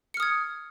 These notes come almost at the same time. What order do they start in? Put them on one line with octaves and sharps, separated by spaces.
C#7 F6 D#6 G#6